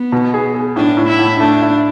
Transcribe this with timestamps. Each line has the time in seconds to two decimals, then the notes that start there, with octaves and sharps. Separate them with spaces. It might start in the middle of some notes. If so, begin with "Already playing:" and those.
Already playing: B3
0.12 B2
0.34 G#4
0.55 G#4
0.76 A2 D4
0.97 A2
1.08 E4
1.19 A2
1.40 A3 D4
1.62 E4